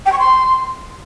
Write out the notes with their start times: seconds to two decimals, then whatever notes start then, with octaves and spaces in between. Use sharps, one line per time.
0.06 G5
0.12 C#6
0.19 C6